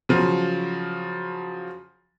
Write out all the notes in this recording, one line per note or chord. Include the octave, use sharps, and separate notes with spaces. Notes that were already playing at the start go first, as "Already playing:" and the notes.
C#3 F3 F#3